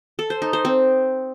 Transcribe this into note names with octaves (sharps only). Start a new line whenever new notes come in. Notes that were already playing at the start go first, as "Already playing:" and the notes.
A4
C5
D#4
C5
C4